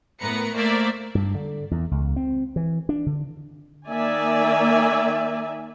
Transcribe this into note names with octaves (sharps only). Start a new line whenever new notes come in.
A2 B3 A#4 B4 A#5 C#7
A3 A#3 A#4 C5 D5 E5
G2
D3
E2
C#2
C4
E3
D4
D3
D#3 A#3 D5 E5 G#5